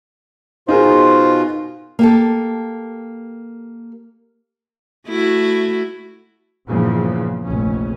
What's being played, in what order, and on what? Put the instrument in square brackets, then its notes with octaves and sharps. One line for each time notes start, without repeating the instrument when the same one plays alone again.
[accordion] B2 F4 [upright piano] D#4 G#4 A#4 [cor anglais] C5
[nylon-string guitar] A#3 G4 A4
[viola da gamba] A3 E4 F#4
[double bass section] E2 G2 A#2 C#3 F3
F1 A#1 C#4